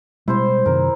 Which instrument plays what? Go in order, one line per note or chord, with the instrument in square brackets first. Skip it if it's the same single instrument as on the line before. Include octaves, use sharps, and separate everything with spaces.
[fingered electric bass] B2 G3 G#3 [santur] E4 C5 C6
[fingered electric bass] F#2 C3 D#3 [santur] A#4